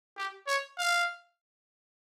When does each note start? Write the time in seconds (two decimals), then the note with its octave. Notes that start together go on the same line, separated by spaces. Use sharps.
0.18 G4
0.47 C#5
0.78 F5